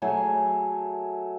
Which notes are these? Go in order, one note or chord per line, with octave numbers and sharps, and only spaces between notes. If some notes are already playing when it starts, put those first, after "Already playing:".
F#3 A3 G#4